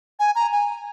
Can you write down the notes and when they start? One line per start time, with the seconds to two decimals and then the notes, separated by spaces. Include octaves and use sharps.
0.19 G#5
0.35 A#5
0.52 G#5